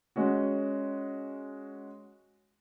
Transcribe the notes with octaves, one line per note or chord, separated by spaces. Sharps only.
G#3 C#4 F#4